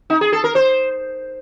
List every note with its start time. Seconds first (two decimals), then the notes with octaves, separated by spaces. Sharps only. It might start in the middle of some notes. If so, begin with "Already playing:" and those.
0.10 D#4
0.21 G#4
0.33 A4
0.44 A#4
0.55 C5